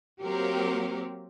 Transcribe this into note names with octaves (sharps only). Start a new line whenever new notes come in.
F#3 A#3 C4 G4 A#4